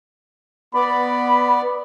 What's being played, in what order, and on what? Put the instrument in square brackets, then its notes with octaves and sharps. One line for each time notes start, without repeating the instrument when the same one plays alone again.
[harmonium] B3 D5 [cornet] B5